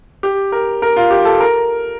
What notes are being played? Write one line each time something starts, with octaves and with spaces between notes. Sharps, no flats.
G4
A#4
A#4
F4
G4
A4
A#4